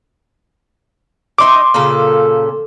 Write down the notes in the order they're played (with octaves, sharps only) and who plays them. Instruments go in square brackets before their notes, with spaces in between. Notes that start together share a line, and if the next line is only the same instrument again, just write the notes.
[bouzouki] D#4 D#5 E5 [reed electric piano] C6 D6
[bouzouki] A#2 C#3 A4